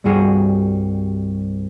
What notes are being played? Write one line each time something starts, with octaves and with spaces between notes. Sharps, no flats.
C2 G2 G3 F#4 G#4